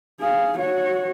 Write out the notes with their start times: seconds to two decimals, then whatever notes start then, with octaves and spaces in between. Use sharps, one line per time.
0.20 G#4 F5
0.58 F#4 C#5